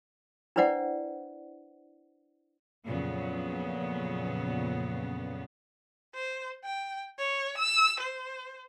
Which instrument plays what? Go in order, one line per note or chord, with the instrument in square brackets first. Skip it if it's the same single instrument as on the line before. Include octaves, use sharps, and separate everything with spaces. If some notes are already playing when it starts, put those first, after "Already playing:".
[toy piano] D4 E4 B4 C5 D5 F#5
[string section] F2 A#2 C#3 F#3 B3
[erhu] C5
G5
C#5
E6
C5